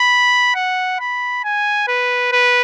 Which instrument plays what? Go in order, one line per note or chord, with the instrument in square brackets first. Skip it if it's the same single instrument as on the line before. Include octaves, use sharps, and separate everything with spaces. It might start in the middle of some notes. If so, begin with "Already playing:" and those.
Already playing: [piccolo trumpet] B5
F#5
B5
G#5
B4
B4